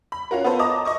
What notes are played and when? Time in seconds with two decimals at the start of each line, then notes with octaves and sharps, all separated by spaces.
0.12 B5
0.31 C#4 F4 F#4 A#4
0.44 B3 F4 A4 B4 C5
0.59 D#5 A5 A#5 D6 D#6
0.85 D#5 C#6 D#6